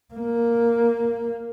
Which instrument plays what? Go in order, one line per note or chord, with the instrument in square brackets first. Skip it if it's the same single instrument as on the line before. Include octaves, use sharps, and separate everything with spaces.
[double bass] A#3